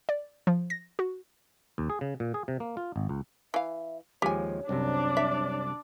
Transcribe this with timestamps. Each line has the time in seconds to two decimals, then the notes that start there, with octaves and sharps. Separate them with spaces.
0.09 D5
0.47 F3
0.70 A#6
0.99 F#4
1.78 D#2
1.90 G#4
2.01 C#3
2.20 A#2
2.34 G#4
2.48 C3
2.60 A#3
2.77 F4
2.96 G#1
3.09 C#2
3.54 E3 E5 F5
4.22 D#2 F3 G#3 G4 C#5 G#5
4.69 C2 F#2 C3 D4 D5
5.17 E5